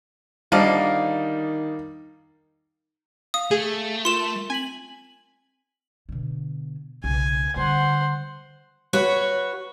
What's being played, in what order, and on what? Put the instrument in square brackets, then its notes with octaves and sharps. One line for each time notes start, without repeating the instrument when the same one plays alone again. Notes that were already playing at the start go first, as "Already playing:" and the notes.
[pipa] D3 F3 A#3 [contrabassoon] D#3 [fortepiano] G3 D4 D#4
[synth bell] F5 [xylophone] D#6
[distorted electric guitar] A3 [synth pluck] G#4
[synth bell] F4 A#4 [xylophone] C6 E7
[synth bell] C4 B6 F#7 [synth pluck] G#5
[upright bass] B2 D3
[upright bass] B1 C#3 [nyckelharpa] G#5
[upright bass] D3 G3 [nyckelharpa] C5 F#5
[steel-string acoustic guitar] F#4 B4 C#5